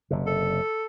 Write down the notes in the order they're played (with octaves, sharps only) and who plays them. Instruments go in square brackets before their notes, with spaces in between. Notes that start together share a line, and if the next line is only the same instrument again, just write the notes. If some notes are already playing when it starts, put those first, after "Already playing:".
[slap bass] F#1 C3
[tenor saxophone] A4